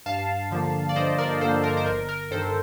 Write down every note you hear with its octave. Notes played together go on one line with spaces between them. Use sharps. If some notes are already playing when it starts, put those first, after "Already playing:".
G2 F5 A5
D3 F3 A#3
D5
G2 C5 D#5
A#4 D5
D3 F3 A#3 A4 C5
A#4
C5
G1 A#4
A#4
G2 D#3 A4 C5